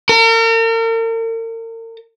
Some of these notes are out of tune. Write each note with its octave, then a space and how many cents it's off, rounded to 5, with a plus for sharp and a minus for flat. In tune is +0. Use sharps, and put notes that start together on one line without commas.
A#4 -40